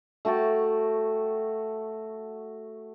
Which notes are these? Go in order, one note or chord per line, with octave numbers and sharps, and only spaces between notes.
A3 F#4 G5 A5